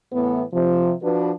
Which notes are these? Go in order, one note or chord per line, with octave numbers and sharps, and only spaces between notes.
A2 E3 B3
C3 F3
F3 D4 F#4 B4